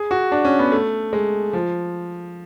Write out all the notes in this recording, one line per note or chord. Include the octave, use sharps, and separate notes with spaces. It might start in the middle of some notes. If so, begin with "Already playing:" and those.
Already playing: G#4
F#4
D4
C#4
B3
A3
G#3
F3